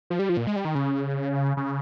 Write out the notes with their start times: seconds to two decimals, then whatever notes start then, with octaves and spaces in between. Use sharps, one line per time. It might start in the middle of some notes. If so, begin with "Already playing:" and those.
0.10 F3
0.19 G3
0.29 F3
0.37 A#2
0.47 G#3
0.56 G3
0.65 D#3
0.75 C#3
1.57 C#3